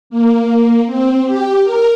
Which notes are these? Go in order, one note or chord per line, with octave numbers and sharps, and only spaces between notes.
A#3
C4
G4
A#4